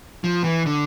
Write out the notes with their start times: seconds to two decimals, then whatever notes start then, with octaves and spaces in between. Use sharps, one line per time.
0.24 F3
0.44 E3
0.66 D3